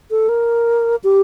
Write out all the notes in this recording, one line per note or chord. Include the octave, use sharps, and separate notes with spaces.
A4
A#4
G4